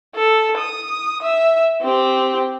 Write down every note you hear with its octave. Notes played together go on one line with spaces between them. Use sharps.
A4
D#6
E5
C4 G4